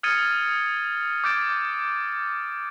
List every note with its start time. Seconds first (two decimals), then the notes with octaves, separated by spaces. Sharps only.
0.03 D#6 F6 G#6 A6 C#7 D#7
1.24 D6 G6 A6 D7